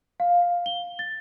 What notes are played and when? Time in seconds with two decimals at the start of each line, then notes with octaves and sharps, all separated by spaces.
0.20 F5
0.66 G7
0.99 A6